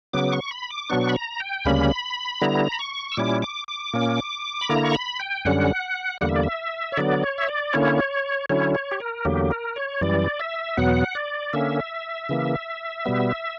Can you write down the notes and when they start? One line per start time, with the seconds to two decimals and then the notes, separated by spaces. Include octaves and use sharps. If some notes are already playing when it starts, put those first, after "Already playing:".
0.13 C#3 F#3 B3 D6
0.32 C#6
0.51 B5
0.70 D6
0.90 B2 F#3 B3 D4 C#6
1.09 B5
1.15 A#5
1.40 G5
1.65 D2 C#3 G3 A#3 C#4 B5
2.41 D3 G3 B3 E4 A#5
2.72 B5
2.79 C#6
3.12 E6
3.17 A#2 G3 C#4 E4 D6
3.42 D6
3.68 D6
3.93 A#2 A#3 C#4
4.61 B5
4.69 D3 A#3 E4 A#5
4.83 C#6
4.94 B5
5.20 G5
5.45 F#2 D3 G3 C#4 F#5
6.21 E2 D3 G3 A#3 F#5
6.29 E5
6.36 D5
6.43 E5
6.92 C#5
6.97 D3 F#3 B3 D5
7.23 C#5
7.38 E5
7.49 D5
7.73 D3 A#3 C#4 E4 C#5
8.50 D3 F#3 C#4 E4 C#5
8.75 C#5
8.92 G4
9.00 A#4
9.25 E2 D3 F#3 A#3 G4
9.51 A#4
9.76 C#5
10.01 F#2 E3 G3 D5
10.40 E5
10.77 E2 B2 F#3 B3 F#5
11.15 D5
11.53 D3 A#3 C#4 E5
12.29 C#3 E3 A#3
13.05 B2 G3 B3